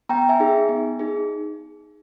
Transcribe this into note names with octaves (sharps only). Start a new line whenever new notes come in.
B3 G5 A#5
E5 G#5
D#4 G#4
B3
D#4 G#4